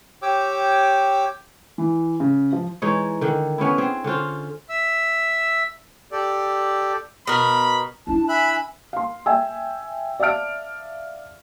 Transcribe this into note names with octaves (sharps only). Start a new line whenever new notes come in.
G4 C#5 G5 D6 E6
E3
C#3
F3
E3 G#3 D#4 C#5
D3 D#3
B3 C#4 D4 E4
C4 G#4
D3 C#4 F4 C5
E5 E6
G4 A4 D5
B2 A#4 B5
D4 E4 A5
E5 G#5 B5 F#6
F5 C6
E5 G5 G#5 E6
D5 E5 F5 A5 F6 D7